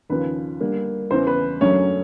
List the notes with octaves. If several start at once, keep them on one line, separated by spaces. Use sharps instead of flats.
D#2 C#3 F3 B4
D3 G3 A#3
E2 C#3 E3 C5
B4
F#2 D3 F#3 A3 C#4 C#5